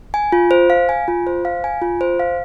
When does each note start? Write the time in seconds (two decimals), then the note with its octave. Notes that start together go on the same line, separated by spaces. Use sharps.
0.14 G#5
0.32 F4
0.51 C5
0.70 F5
0.89 G#5
1.08 F4
1.27 C5
1.45 F5
1.64 G#5
1.82 F4
2.01 C5
2.20 F5